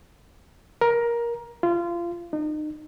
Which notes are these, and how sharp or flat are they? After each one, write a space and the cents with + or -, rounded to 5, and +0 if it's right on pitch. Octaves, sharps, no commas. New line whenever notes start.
A#4 +15
F4 -25
D#4 -35